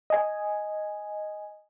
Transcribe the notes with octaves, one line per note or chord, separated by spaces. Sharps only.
D#5 G#5